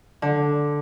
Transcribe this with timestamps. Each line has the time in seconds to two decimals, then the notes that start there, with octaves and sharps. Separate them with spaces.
0.22 D3